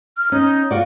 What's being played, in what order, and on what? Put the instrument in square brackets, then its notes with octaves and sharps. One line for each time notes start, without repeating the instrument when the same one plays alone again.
[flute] F6
[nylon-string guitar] C#4 [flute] D#4
[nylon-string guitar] F4 F#4 D5